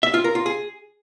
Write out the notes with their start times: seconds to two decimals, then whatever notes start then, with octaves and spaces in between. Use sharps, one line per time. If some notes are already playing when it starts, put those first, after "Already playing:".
0.03 E5
0.14 F4
0.24 A#4
0.35 F4
0.46 G#4